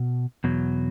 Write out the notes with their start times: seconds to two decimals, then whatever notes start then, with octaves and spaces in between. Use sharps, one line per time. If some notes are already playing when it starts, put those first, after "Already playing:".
Already playing: B2
0.44 E2 B2 F#3